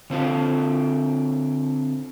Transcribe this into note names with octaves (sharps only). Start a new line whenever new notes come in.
D3 C4 F4 A4